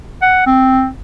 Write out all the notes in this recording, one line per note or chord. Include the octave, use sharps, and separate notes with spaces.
F#5
C4